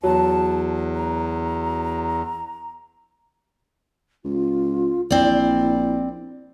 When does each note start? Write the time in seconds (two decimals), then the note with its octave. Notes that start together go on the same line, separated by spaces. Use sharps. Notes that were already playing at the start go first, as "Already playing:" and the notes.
0.03 E2 F#3 A5
0.95 A#5
4.24 C#2 F4
5.11 A#1 C4 E4 D5